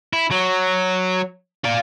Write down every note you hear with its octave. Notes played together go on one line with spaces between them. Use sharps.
E4
F#3
F4 D5